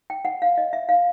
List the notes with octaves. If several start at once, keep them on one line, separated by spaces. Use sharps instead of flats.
G5
F#5
F5
D#5
E5
F5